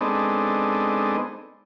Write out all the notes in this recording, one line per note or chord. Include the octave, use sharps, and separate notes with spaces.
G#3 B3 C4 D4 D#4 A4